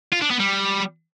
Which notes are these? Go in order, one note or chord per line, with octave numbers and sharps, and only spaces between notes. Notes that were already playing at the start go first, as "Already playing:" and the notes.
F4
D4
B3
G3